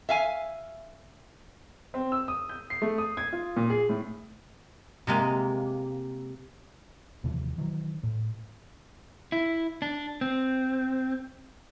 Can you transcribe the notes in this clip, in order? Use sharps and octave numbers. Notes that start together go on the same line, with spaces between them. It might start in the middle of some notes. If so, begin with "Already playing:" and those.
E5 F5 G#5
C4
E6
D#6
G6
C7
A3
D#6
G#6
F4
A#2
G#4
A2
C3 G#3 A#3
D#2 C3 E3 F3
D#3 E3 F#3
A2
E4
D4
C4